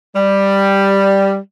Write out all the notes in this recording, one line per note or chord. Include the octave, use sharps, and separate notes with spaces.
G3